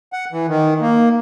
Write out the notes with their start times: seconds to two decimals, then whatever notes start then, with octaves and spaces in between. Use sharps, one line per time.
0.13 F#5
0.32 E3
0.48 D#3
0.81 A#3